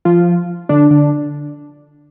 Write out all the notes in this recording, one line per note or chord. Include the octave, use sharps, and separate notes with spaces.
F3 F4
D3 D4
D3 D4